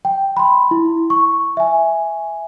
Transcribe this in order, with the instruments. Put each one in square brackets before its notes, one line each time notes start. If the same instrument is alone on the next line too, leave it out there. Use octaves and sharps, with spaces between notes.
[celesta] G5
B5 C6
E4
C#6
E5 G#5